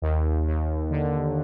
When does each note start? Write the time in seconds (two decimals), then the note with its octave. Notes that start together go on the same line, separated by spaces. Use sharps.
0.02 D#2
0.47 D#2
0.91 D3